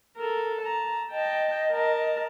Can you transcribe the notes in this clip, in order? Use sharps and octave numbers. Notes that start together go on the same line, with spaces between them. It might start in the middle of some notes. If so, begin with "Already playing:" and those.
A4 A#4
A5 A#5
D#5 G5 A5
A#4 A5